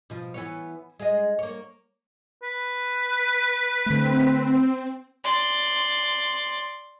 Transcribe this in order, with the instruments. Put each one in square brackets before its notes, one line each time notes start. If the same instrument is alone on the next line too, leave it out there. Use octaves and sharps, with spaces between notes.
[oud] B2 F3
E3 B3 C#5
G#3 D#5
A#3 C#5
[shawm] B4
[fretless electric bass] D3 A3 [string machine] C4
[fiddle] D5 C6